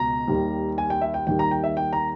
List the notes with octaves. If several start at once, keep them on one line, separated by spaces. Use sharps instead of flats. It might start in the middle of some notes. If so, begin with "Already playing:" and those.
Already playing: C#2 B2 A#5
D#2 D#3 G3
G#5
G5
E5
G5
D#2 D#3 G3 G5
A#5
G5
E5
G5
A#5